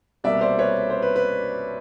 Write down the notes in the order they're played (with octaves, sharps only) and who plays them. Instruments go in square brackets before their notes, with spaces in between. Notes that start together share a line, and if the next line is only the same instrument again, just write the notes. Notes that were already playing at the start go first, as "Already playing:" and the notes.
[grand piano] C2 B2 G3 A#3 D5 E5
C5 D5
B4 C#5
C5
B4
B4